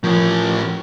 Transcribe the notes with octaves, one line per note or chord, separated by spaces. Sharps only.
A2 F3 C#4 A#4